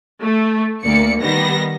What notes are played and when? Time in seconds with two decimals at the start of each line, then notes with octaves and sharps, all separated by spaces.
0.22 A3
0.83 D2 A#3 D5 C#7
1.21 D#3 G3 B3 A#6